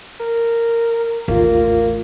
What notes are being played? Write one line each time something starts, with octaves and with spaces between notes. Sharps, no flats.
A#4
A1 D#2 A#3 F4